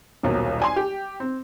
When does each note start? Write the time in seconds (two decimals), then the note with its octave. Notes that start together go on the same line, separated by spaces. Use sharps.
0.23 D#1 B1 F#3 A#3
0.60 D5 G#5 C6
0.76 G4
1.20 C4